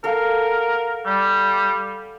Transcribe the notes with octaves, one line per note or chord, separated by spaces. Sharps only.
A4 A#4 F5 F#5
G3